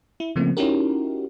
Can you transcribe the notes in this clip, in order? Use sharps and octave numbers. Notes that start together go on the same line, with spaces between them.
E4
C#3 F3 A3 A#3 C4
C#4 D#4 E4 F#4 G4 A#4